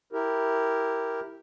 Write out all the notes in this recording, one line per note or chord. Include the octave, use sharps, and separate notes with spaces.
E4 G4 A#4